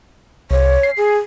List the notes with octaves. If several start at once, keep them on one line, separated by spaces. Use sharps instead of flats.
C2 C#5
C7
G#4